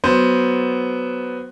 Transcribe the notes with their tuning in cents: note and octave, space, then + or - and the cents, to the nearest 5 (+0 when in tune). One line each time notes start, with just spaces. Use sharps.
F#3 +5 B3 +0 C5 +0